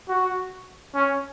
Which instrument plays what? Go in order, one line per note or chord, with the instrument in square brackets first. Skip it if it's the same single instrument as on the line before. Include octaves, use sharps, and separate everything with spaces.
[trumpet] F#4
C#4